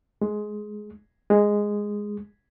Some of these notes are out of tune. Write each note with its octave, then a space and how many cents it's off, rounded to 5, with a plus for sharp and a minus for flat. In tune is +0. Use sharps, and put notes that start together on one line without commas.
G#3 +15
G#3 -5